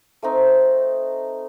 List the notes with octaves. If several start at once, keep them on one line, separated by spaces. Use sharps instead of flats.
A3 C4 D#4